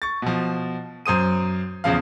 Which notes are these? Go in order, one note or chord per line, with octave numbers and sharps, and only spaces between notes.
C#6 A6
B2 F3
F#2 C5 D#6 D#7
E2 C#3 F3 F5